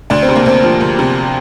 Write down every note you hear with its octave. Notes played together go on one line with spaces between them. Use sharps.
D2 D4
C4
C3
A#3
D2 C4
F3
D2
C3